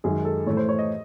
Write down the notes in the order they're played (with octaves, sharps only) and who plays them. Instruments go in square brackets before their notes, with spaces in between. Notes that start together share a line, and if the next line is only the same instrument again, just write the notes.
[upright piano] F#2 D#3 G#3 G#4
A4
A2 E3 A3 C#5
C5
C#5
D#5